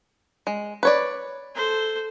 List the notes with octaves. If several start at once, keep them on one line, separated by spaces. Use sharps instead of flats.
G#3
B4 C#5 D5
A4 C5